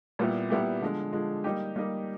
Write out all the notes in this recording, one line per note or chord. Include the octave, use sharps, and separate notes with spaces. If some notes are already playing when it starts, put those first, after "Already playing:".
A#2 G3 B3 E4 G4
A#2 G3 B3 E4 G4
D3 F3 G#3
D3 F3 G#3
G3 A#3 D#4 G4
G3 A#3 D#4 G4